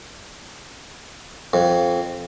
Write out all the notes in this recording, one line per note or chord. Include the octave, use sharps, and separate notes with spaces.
F2